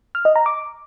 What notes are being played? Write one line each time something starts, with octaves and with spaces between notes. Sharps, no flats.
F6
D#5
A#5
D6